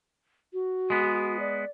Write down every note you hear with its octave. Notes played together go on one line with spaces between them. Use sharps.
F#4
G#3 B3
D5